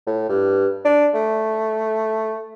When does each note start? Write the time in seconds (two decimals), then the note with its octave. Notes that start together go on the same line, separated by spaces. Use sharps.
0.06 A2
0.29 G2
0.85 D4
1.14 A3